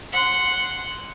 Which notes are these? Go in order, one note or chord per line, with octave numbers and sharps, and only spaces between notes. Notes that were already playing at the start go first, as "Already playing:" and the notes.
F#5 C6